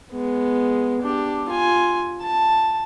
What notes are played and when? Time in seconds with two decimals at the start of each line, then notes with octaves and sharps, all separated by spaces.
0.11 G#3 B3
1.02 D4 G4
1.49 F4 G#5
2.22 A5